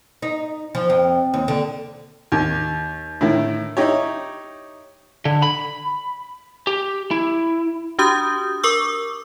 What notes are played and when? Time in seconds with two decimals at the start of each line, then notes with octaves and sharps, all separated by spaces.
0.22 D#4
0.75 F3
0.90 F2
1.34 D#2
1.48 D3
2.32 D#2
3.21 A2 D3 D#3 E4
3.77 D#4 E4 G4 C#5
5.25 D3
5.42 B5
6.67 G4
7.11 E4
7.99 D4 F#4 G4 D#6 G6
8.63 A#4 C#6 D6 E6